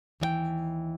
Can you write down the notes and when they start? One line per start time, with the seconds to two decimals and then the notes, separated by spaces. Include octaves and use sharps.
0.20 D#2 E3 D#5 G5